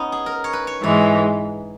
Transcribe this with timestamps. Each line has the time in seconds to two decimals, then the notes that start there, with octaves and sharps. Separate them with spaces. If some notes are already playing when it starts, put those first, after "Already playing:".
Already playing: B3 C#4 D#4
0.12 G#4
0.26 A#4
0.44 C#5
0.53 B4
0.67 C#5
0.81 G#2 E3 G#3 C#5